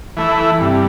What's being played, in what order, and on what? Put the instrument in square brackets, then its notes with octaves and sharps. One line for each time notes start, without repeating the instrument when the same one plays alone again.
[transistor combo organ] E3 A3 E4
[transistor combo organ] G2 [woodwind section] C3 C4